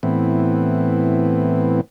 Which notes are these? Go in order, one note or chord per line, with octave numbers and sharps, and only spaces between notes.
A2 E3 B3 C4